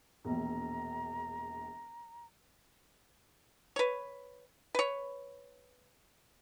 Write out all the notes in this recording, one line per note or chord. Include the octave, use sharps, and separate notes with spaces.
E1 A#1 A#5
B4 C#5
B4 C#5